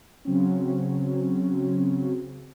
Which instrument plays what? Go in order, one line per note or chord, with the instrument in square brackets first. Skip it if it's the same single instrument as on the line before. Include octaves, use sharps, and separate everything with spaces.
[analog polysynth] C#3 F#3 C4 C#4